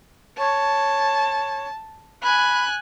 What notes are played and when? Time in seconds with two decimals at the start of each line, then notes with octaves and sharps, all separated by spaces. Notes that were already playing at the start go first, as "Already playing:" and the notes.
0.38 C#5 A5
2.23 G#5 B5 F#6